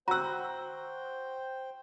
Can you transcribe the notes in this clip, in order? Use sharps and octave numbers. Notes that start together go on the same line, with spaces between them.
F#4 C5 G5 A#5 E6 F#6